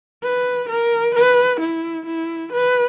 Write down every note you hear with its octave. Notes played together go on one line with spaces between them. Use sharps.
B4
A#4
B4
E4
E4
B4